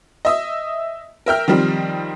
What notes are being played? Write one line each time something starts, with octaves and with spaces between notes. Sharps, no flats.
D#5 E5 D#6
A#4 E5 G5 F6
D#3 F3 G3 C4